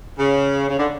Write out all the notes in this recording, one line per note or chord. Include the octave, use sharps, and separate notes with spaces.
C#3
C#3
D3